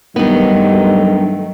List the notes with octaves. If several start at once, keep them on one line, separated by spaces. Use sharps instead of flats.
G2 D#3 F#3 A3 B3 D#4